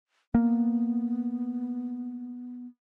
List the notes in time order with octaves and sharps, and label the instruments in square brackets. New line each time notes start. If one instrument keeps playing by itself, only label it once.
[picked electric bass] A#3 [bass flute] B3